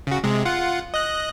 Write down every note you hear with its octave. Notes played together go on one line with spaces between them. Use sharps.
C#3 F#4
C3 G#3
F4 F#5
D#5 F#6